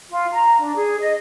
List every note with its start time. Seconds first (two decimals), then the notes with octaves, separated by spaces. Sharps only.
0.10 F4
0.33 A#5
0.59 D4
0.76 G#4
1.00 D#5